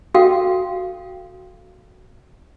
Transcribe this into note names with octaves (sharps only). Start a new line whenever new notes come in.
F#4 A4 F5 G5